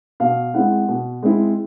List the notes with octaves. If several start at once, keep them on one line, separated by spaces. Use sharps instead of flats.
B2 F5
G#3 C4 E4 F#5
B2
G#3 C4 E4